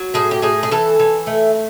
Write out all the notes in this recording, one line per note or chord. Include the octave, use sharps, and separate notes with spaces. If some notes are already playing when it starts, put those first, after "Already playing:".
Already playing: F#3
A2 G#4
G4
A2 G#4
G#4
E3 A4
E3
A3